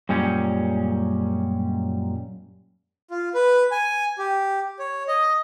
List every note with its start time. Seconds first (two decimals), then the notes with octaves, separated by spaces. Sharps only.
0.09 F#2 A#2 G3 G#3 C#4
3.11 F4
3.34 B4
3.71 G#5
4.18 G4
4.79 C#5
5.08 D#5